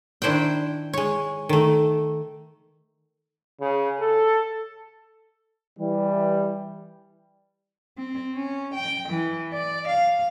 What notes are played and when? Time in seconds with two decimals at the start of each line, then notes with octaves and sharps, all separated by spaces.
0.22 D#3 D4 E4 C5 F#5 G5
0.93 G#3 C#5
1.49 D#3 A3
3.60 C#3
3.99 A4
5.79 E3 G3
7.98 C4
8.34 C#4
8.75 G5
9.09 E3
9.53 D5
9.88 F5